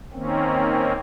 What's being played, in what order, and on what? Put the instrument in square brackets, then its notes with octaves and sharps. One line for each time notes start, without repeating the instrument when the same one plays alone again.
[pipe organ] D#3 A#3 C4 C#4